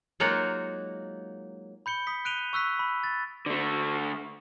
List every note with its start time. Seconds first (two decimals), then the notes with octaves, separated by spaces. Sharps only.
0.20 F#3 G#3 A#3 D#4 F4 F#4
1.86 B5 G6 C#7 G7
2.07 D#6 B6
2.25 F#6 D7 D#7 F7 G7
2.53 C#6 E6 F#6 B6
2.79 B5
3.04 A6
3.46 D3 A3